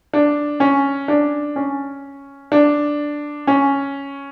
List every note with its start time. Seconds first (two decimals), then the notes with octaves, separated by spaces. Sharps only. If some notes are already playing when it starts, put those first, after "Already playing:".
0.13 D4
0.60 C#4
1.08 D4
1.56 C#4
2.52 D4
3.47 C#4